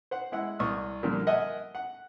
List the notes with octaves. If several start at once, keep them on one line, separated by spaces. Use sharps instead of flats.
C5 F#5
G#3 E4 F#5
C2 C#6 D#6 F6
A#2 D3 F3 G3 A#3
A#4 D#5 E5 F#5 G#5
F#5